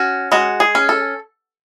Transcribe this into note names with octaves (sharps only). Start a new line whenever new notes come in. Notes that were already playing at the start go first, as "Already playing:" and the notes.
Already playing: C#4 F#4
G#3 F#4
G#4
C#4
A4